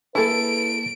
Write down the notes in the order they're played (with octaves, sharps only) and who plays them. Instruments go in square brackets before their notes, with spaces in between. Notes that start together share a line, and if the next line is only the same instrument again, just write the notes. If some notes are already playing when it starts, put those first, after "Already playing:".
[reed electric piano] A#3 A5 [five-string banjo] E4 G#4 A4 [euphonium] B4 [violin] D7